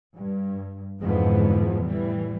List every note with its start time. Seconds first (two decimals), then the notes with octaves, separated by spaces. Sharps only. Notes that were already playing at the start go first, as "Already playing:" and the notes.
0.17 G2
1.00 F2 G#2 D3 E3 F3 B3
1.83 A2 E3 G3